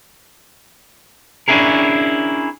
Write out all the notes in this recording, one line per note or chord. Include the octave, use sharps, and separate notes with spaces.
C#4 D4 E4 G#4 A#4